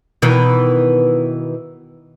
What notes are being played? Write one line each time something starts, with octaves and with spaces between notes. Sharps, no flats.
B2 D#3 E3